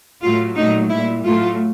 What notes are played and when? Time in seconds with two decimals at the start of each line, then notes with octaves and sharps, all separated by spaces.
0.23 A2 F#3 A3 F4
0.57 A#2 F#3 A3 D#4
0.90 A#2 G3 E4
1.24 A2 F#3 A3 F4